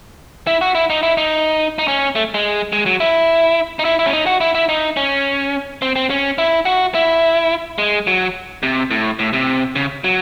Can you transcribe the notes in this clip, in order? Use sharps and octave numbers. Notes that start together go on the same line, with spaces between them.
E4
F#4
E4
D#4
E4
D#4
D#4
C#4
A3
G#3
G#3
F#3
E4
D#4
E4
E4
C#4
D#4
F#4
E4
E4
D#4
C#4
C4
C4
C#4
E4
F#4
E4
G#3
F#3
C3
A2
A2
C3
C#3
F#3